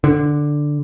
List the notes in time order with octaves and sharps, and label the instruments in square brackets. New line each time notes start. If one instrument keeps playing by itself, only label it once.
[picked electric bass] D3